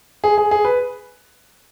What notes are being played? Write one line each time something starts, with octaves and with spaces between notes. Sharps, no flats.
G#4
G#4
G#4
B4